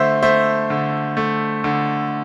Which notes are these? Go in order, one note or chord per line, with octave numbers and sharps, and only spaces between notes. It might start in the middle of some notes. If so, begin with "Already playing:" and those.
Already playing: D3 A3 C5 E5
A3 C5 E5
D3
A3
D3